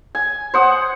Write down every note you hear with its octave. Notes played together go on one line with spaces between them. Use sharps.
G#5
C5 F#5 D#6